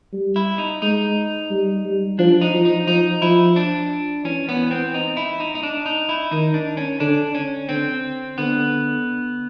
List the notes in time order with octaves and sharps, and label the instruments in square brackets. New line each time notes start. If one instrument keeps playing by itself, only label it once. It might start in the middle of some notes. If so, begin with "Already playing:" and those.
[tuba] G3
[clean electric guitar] E4
D#4
[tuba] G#3 [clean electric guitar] D#4
[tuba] G3
G3
[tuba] F3 [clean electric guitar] D4
[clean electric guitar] D#4
[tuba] F3
[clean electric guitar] D#4
[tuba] F3 [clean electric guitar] D#4
[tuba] F3 [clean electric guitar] E4
[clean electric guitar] D4
[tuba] E3 [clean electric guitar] C#4
[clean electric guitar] B3
C4
D#4
E4
D#4
D#4
D4
D#4
E4
[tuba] D#3 [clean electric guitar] D#4
[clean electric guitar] D4
C#4
[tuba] D3 [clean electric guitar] D4
[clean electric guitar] C#4
[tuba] D3 [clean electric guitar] C4
[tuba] D3 [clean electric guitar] B3